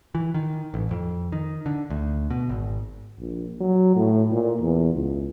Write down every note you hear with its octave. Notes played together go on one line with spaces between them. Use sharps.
E3
D#3
A1
F2
D#3
D3
D2
B2
G#1
A#1
F#3
A2
A#2
E2
C#2